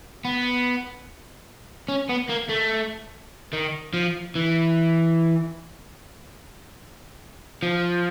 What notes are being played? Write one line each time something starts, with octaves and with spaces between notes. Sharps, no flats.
B3
C#4
B3
A#3
A3
D#3
F3
E3
F3